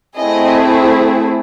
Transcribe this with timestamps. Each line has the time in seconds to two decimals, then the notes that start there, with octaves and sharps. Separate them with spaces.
0.16 A3 C4 E4 G#4 D#5